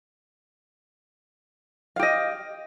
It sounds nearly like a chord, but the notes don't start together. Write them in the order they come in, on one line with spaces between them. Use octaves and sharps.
F5 G4 D#5